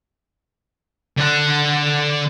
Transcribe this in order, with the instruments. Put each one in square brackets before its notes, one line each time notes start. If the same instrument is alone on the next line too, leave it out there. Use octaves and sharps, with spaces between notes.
[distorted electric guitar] D3 F#5